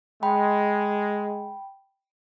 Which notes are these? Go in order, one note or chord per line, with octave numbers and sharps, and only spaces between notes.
G#3 G5 B5